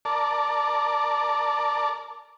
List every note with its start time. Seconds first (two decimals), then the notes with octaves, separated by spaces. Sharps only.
0.05 A#4 D5 A5